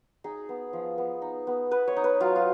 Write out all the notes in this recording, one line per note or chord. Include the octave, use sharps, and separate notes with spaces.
D#4 G#4
B3
F3
B3
D#4
B3
B3 B4
C#5
D#4
B4
F#3 F4
F4